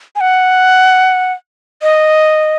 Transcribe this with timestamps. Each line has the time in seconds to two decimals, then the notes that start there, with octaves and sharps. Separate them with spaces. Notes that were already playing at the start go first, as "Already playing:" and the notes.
0.16 G#5
0.21 F#5
1.82 D#5